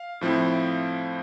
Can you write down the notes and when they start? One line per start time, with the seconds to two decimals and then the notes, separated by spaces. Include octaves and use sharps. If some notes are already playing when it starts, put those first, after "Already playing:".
Already playing: F5
0.21 A2 F3 C4 E4